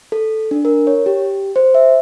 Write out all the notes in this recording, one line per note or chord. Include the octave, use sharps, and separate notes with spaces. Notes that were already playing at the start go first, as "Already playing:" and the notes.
A4
D4
A#4
C#5
G4
C5
E5